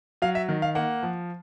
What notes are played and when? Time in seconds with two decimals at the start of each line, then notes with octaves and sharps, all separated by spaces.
0.22 F#3 F5
0.35 E5
0.49 D#3
0.62 F5
0.75 A#3 F#5
1.03 F3